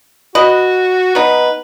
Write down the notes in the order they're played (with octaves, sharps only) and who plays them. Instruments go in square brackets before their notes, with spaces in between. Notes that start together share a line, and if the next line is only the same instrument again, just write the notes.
[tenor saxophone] F#4 [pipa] B4 D#5
[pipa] B3 D#4 [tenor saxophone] B4